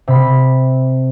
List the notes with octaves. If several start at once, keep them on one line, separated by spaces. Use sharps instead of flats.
C3 B5